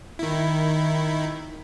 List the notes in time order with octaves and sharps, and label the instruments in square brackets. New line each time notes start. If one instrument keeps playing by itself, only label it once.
[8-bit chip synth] D#3 E4